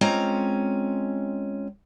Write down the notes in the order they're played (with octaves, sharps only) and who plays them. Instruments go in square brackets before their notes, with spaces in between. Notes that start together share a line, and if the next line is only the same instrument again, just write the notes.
[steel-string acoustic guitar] G#3 C4 C#4 F4 A#5